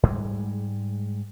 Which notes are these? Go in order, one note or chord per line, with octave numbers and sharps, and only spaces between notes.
G#2 G3 G#3